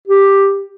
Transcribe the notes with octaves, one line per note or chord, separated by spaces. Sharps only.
G4